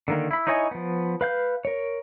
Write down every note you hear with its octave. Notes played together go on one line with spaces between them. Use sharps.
D3 D#3 A#3
E4 B5
D#4 E4 C#5 D#5 G#5
F3 B3
B4 F5 G6
A#4 C#5